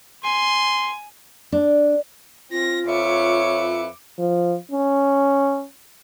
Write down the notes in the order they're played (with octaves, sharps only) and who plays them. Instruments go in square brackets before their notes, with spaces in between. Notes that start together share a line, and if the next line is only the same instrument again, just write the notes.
[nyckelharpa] G#5 [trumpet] C6
[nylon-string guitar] D4
[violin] C4 A#6 [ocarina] F4
[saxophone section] F2 B4 E5 [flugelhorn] C#5 [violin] D6 C#7
[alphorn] F3
C#4